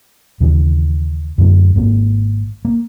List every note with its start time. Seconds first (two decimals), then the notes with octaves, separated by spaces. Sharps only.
0.40 D#2 C#3 E3
1.38 F#2 D3 F#3 A3
1.75 G#1 G#2 A#3
2.65 A#3